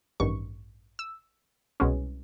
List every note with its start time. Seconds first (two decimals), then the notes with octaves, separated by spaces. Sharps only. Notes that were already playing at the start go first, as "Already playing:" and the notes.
0.20 A1 G2 D#3 C#6
0.99 E6
1.80 C2 B2 G#3 C#4